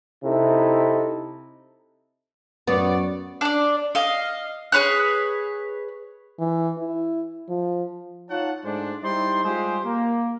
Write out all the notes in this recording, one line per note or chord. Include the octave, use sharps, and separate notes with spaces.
C3 D#4 E4 A4
F#2 B3 C#5 D5
D4 D5
D#5 F5
G#4 B4 C#5 F#6
E3
E4
F3
D#4 F4 C#5 F#5 A5
G#2 G#3 A3 D4 C5 D5
G3 D#4 E4 C5 D5 C6
G3 G#3 F4 G4 G#4 C5
A#3